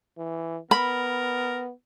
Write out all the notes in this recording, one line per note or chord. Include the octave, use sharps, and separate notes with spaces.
E3
B3 A#4 B5